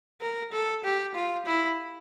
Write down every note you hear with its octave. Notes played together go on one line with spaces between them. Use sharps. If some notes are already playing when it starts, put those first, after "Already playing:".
A#4
A4
G4
F4
E4